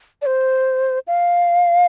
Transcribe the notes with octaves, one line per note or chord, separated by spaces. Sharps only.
D5
C5
F5